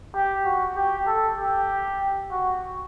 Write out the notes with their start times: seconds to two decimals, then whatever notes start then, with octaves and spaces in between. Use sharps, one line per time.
0.14 G4
0.45 F#4
0.76 G4
1.07 A4
1.38 G4
2.31 F#4